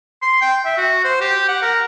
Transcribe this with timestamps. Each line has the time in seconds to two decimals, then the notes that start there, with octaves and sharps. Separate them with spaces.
0.22 C6
0.42 G5
0.65 E5
0.77 F#4
1.04 C5
1.21 G4
1.48 F#5
1.62 A#4